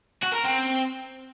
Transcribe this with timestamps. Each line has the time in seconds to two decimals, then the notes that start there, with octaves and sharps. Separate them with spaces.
0.23 F#4
0.33 A#4
0.44 C4